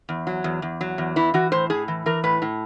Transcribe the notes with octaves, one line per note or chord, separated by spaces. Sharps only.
E2
F#3
E2
E2
F#3
E2
E3 E4
E3 F#4
A2 C5
A2 G#4
E3
E3 A#4
A2 B4
A2